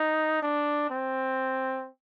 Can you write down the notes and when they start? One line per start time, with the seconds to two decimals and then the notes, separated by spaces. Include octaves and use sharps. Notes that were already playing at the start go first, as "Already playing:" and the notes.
Already playing: D#4
0.42 D4
0.90 C4